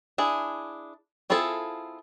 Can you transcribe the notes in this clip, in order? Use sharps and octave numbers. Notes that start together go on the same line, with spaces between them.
D4 E4 G#4
C4 E4 F4 G#4 A4